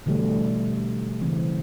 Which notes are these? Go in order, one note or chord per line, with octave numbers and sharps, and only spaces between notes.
B2 D3 E3 G3 A3
C#3 E3 C4